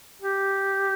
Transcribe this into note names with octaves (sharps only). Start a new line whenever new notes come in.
G4